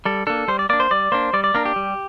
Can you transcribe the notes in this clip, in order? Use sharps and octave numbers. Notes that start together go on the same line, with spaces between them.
G3 A4
A#3 D4 A4
G3 C5
D5
A#3 D4 D5
C5
G3 D5
A#3 D4 C5
G3 D5
D5
A#3 D4 A#4
G4
G3